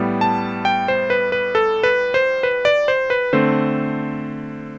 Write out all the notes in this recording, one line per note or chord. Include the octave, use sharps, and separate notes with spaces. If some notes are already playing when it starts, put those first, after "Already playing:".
Already playing: A2 G3 B3
A5
G5
C5
B4
B4
A4
B4
C5
B4
D5
C5
B4
D3 A3 C4 C5